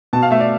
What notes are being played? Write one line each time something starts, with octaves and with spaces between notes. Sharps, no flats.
B2 A5
F5
A3 E5
D5